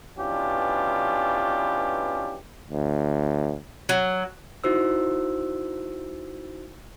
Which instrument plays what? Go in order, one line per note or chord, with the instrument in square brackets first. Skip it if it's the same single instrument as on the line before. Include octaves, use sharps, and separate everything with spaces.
[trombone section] B2 E3 C#4 D4 F4 G4
[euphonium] D2
[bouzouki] F#3
[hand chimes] D#4 E4 F#4 C5 E6